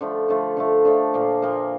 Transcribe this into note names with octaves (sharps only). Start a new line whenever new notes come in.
D3 F3 A3
D3 F3 A3
D3 F3 A3
D3 F3 A3
A#2 F3 A#3
A#2 F3 A#3